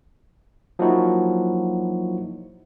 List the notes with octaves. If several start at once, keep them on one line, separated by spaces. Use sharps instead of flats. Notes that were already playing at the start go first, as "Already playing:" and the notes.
F3 F#3 A#3 D#4 E4 F#4